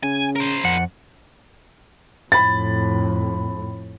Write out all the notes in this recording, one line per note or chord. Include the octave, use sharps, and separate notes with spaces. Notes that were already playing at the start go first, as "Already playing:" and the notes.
C#3 G#5
A#4 C5
F2 F#5
F2 A2 B5 A6